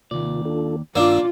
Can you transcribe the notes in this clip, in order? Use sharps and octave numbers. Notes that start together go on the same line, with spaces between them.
D#2 C3 A#3 F4 D5
D4 F4 A4
G2 D#3 A#3 D4 F4 D5 E6